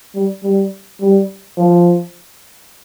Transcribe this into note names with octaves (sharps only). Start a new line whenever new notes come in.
G3
G3
G3
F3